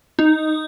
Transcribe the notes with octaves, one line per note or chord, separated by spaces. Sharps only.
D#4